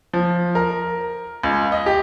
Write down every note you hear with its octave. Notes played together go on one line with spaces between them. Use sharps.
F3
A#4
C#2
D#5
G4